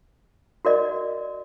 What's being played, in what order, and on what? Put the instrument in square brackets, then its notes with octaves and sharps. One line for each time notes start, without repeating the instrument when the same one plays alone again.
[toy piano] F#4 A#4 D5 D#5